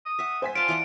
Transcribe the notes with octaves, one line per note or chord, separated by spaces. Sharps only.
D#6
E5 F#5
C5 G#5 B6
F4 D5 A5 D7
E3 D5 F#5